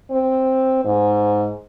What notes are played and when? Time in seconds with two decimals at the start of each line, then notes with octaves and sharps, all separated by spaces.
0.11 C4
0.85 G#2